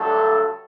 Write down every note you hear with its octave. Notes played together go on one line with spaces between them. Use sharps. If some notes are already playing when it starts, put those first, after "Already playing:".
Already playing: G2 D3 F#3 A3 A4